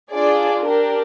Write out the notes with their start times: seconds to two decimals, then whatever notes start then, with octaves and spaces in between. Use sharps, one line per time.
0.12 D4 F4 G#4 D5
0.64 D4 G4 A#4